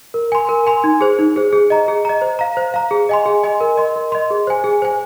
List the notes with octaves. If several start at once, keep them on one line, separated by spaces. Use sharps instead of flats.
A#4
G#5 C6
A#4
G#5 C6
D#4
G#4 C5
D#4
G#4 C5
G#4
D#5 A#5
G#4
D#5 A#5
C5
F5 A#5
C5
F5 A#5
G#4
D#5 G#5 C6
G#4
D#5 G#5 C6
A#4
D#5 C6
A#4
D#5 C6
G#4
C5 G#5
G#4
C5 G#5